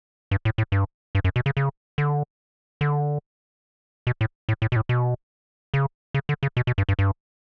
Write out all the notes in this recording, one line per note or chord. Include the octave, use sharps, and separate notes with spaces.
G2
A2
A2
G2
G2
F#2
B2
C#3
C#3
D3
D3
B2
A2
A2
A2
B2
A2
B2
C#3
C#3
D3
C#3
B2
B2
G2
G2
G2